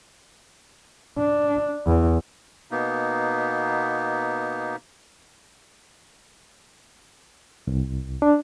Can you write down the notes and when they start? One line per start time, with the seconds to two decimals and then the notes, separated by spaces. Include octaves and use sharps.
1.18 D4
1.86 E2
2.71 B2 A#3 B3 D#4
7.67 C2
8.22 D4